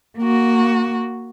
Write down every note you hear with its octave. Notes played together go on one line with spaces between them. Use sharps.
A#3 F#4